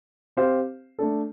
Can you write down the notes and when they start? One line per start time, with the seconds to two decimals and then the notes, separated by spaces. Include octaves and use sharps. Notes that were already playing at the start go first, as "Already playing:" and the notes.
0.37 C4 G4 C5 F5
0.99 A3 D4 A4